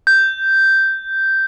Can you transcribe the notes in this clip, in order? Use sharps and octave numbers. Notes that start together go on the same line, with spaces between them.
G6